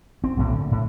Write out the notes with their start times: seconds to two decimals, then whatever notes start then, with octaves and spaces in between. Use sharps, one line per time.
0.24 C4
0.37 B1 A2 A#3
0.53 D3
0.72 A2